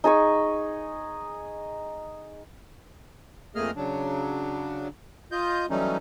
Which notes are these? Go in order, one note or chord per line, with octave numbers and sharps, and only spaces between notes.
D#4 G#4 D#5 C#6
F2 A3 A#3 G#4 D#5 F6
C#3 F#3 D4
F4 D#5 G6
E3 F#3 G3 A3 C#4 D#4